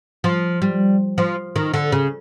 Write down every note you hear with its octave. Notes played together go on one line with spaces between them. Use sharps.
F3
G3
F3
D#3
D3
C#3